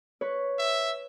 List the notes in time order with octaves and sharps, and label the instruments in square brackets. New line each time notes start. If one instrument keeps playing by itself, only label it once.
[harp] B4 C#5
[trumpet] E5